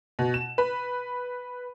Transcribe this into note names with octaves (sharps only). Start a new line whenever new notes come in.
B2
E7
B4